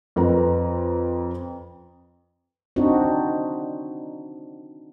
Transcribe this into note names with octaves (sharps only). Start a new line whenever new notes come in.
F2 B4 A#5
C4 D4 D#4 F#4